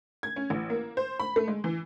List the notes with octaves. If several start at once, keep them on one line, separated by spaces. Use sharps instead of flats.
G#6
C#4
A1
A#3
C5
B5
A3
G#3
E3